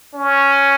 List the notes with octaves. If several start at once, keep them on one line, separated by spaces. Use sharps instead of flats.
C#4